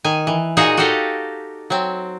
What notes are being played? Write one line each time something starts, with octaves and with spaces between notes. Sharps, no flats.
D#3 G#5
E3
A#2 D#4 F#4 G#4
F#4 G4 A4 D#5 F5
F#3 C4